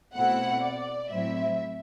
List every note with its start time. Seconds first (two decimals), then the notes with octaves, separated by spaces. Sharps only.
0.15 B2 A3 C4 E4 F#5
0.63 D5
1.10 A2 F#3 C4 E4 E5